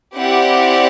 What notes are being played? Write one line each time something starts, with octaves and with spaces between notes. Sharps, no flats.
C4 E4 G4 D5 F#5